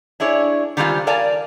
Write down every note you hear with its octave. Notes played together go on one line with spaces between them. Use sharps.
D4 E4 G#4 C#5
D#3 G3 G#3 C4 E4 F4
A#4 D5 F5 G#5 A5